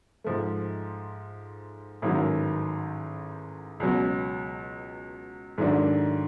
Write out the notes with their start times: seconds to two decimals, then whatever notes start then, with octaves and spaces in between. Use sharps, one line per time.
0.24 G#2 F3 A3
2.02 A1 G#2 D#3 F#3
3.80 C#2 B2 F#3
5.58 G#2 D#3 F#3 A3 D4